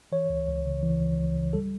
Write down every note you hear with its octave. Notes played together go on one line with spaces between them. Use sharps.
E3 C#5
C#2
C#2
C#3
E3
C#2
C#2
C#3
G3 A4